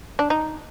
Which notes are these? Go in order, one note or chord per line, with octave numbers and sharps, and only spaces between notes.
D4
D#4